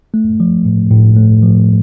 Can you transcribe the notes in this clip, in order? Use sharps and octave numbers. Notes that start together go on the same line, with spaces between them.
A3
F3
A2
A2
A3
F3